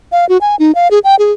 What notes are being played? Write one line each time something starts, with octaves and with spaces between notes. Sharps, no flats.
F5
F#4
G#5
D#4
F5
G#4
G5
G#4